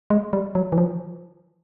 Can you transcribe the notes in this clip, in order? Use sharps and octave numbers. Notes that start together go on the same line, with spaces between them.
G#3
G3
F#3
E3
F3